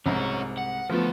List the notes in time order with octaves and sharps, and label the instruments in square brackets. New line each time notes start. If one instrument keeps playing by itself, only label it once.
[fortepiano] C2 G#2 [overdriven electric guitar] C#4 F#4
[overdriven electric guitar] F#5
[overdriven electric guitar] D2 A4 [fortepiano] F3 A3 B3